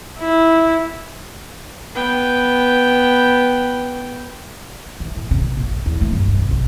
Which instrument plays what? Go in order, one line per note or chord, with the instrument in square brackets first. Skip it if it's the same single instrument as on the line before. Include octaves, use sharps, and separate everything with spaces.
[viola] E4
[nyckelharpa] B3 G5
[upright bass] E3
A2
C#3
A#1
A#1
G2
E2
A3
G2
G2
B1
B1